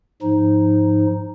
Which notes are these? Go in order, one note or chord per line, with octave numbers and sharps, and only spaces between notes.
G#2 F3 D#4